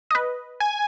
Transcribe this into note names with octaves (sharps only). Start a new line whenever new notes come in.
B4 D#5
G#5